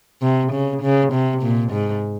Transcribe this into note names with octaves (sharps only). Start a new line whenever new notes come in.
C3
C#3
C#3
C3
A#2
G#2